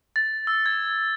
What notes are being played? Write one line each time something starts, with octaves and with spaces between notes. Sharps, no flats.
A6
E6
G#6